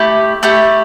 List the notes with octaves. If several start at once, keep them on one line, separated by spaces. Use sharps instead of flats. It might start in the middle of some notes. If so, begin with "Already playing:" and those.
Already playing: A3 E4 G4
A3 E4 G4